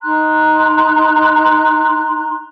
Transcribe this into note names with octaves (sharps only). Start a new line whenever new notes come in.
D#4 A#5 C6 F#6